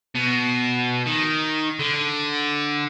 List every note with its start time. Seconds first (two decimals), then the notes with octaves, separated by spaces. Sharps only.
0.15 B2
1.06 D#3
1.79 D3